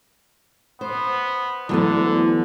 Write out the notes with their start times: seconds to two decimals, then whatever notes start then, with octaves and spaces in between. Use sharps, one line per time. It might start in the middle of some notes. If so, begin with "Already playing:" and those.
0.81 B3 C5
1.69 D2 D3 E3 F#3 B3 A4